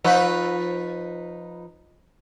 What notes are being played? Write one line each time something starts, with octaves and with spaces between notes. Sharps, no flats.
F3 D#4 B4